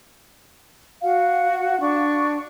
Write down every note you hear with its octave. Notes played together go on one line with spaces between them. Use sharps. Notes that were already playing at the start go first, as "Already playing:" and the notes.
F#4 F5 F#5
D4 C#6